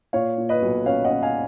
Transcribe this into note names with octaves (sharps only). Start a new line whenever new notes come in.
A#2 C#5 F5
A#2
B4 D#5
B1
C#4 C#5 F5
D#5 F#5
C#4
F5 G#5